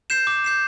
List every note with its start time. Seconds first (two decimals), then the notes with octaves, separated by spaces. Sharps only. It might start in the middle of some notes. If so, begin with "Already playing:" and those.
0.10 G6 C7 E7
0.27 D6
0.44 G6 C7 E7